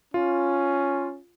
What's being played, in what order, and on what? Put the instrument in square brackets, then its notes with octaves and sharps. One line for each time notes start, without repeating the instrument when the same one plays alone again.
[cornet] C#4 [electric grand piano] F4